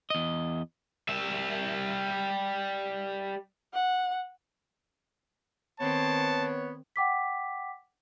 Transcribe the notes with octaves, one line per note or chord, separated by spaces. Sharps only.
E2 D#5
G3 E5
F#5
D#3 B3 C4 C#5 A5
F#5 G5 D6 B6